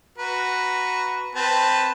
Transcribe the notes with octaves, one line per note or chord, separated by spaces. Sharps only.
F#4 B4 A#5
C4 B4 A5